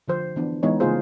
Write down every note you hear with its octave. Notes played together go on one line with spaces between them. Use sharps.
D3 F3 C5
E3 B3 D4
E3 G#3 B3 D#4 C#5
C#3 A3 A#3 F4 G#4 C5